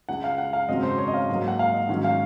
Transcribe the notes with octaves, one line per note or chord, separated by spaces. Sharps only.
C#2 C#3 G#3 F#5
F5
F#5
F5
G#1 F#2 C#3 F#3 C4 D#5
C5
C#5
D#5
F5
G#2 F#3 A#3
F#5
F5
D#5
G#2 D#3 F#3 C#4 F#5
F5